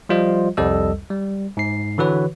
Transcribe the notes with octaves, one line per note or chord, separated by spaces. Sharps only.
F3 G3 F4 C5 D#5
C2 F2 G3 A4 D#5 E6
G3
G#2 C7
D3 E3 F#4 B4 C#5